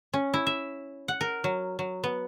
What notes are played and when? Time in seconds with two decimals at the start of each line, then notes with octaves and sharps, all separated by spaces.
0.13 C#4
0.34 E4
0.47 E5
1.08 F#5
1.21 A#4
1.44 F#3
1.79 F#3
2.04 B3